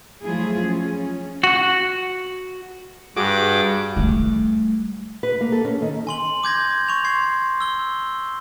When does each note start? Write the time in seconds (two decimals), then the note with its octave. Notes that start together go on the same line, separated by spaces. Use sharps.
0.24 F3 F#3 A3 E4 F4 G#4
0.61 C#4
1.44 F#4
3.16 G2 F#4 G#4 F#5 D6
3.96 G3 A3
5.23 B4
5.41 A#3
5.52 A4
5.65 C#4
5.82 D#3
6.07 G#5 C6 F#7
6.43 D6 G6 G#6 A#6
6.88 C#6 F7
7.05 C6 G#6 C7 F7
7.61 E6 G7